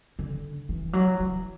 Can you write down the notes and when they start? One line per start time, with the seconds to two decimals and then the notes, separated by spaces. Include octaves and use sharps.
0.19 D3
0.69 E3
0.93 F#3
1.20 E3